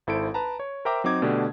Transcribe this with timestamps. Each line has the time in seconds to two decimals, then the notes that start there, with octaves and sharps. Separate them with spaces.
0.07 G#1 E4 A4 C5 D7
0.34 B4 A5 A#5
0.59 C#5
0.85 A#4 C5 E5 G5 A#5 D6
1.04 F#3 C4 D#4 D6 G#6
1.22 B2 D3 A3 D4 G4